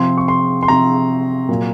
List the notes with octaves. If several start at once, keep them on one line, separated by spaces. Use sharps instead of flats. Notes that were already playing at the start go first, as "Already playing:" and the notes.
Already playing: C3 F3 C4 C6
C#6
C6
C6
C3 F3 C4 A#5
A#2 F#3 A#3